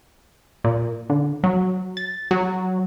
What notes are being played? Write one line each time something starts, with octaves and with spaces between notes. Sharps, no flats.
A#2
D3
F#3
A6
F#3